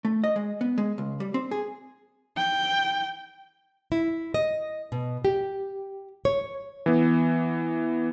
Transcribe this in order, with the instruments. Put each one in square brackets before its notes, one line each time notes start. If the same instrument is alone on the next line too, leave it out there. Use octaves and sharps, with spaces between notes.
[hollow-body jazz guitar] A3
D#5
G#3
B3
G#3
C#2
G3
C4
G#4
[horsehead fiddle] G5
[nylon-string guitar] E4
D#5
B2
G4
C#5
[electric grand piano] E3 B3